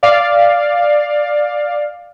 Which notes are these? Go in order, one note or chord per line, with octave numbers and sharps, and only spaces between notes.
D5 F5